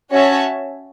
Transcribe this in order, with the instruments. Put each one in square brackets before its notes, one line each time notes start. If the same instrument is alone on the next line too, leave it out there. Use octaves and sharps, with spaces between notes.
[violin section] C#4 F#4 C#5 E5 A5